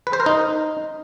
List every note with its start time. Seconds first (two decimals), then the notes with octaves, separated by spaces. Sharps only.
0.07 B4
0.13 C5
0.20 A#4
0.26 D#4